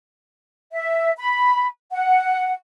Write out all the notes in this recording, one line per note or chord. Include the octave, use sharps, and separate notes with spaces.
E5
B5
F#5